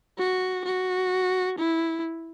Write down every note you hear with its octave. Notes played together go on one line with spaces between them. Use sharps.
F#4
F#4
E4